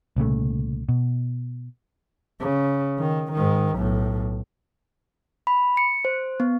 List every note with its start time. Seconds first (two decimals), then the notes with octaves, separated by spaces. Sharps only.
0.16 C2 A#2 C#3 A3
0.89 B2
2.40 C#3
2.99 D#3
3.33 G#2 D#3
3.76 B1 A2
5.47 B5
5.77 C#7
6.05 C5
6.40 B3